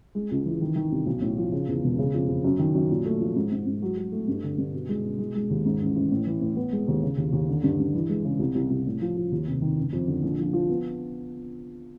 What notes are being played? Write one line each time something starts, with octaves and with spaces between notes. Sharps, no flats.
G#3
C#2
E3
D#3
D#3
C2
B1
A2
F3
C#3
E2
E1
C#3
F2
F2
F#2
D#3
F#2
A#2
A3
F3
G#2
G#2
G#2
F#3
F#3
A3
G2
D3
G2
B2
G#3
B2
G#3
G#3
D#2
G#2
A1
A1
A2
E3
A2
B3
G#3
D#2
C#3
D#2
D#2
D3
G2
G2
E3
G#3
C#3
C2
C2
C2
A2
F3
F3
D#2
F1
D#3
F#1
F2
D3
A#1
F3
F3
B3